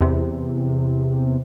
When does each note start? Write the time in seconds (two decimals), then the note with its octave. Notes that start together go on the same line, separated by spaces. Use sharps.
0.01 E2 C3